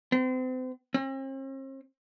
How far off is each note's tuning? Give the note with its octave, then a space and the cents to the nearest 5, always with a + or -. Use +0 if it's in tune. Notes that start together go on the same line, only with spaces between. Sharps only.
C4 -35
C4 +45